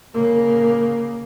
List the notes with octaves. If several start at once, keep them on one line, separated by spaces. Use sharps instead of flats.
C#3 A#3